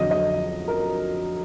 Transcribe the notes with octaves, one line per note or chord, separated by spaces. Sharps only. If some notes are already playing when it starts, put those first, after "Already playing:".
Already playing: F2 D3 F#3 D#5
D#5
A#4